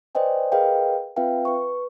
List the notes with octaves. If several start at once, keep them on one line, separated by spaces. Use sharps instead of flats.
B4 C5 D5 D#5 G5 G#5
G#4 A#4 B4 D#5 F5 G5
C4 F4 B4 E5 F5 G5
B4 C#6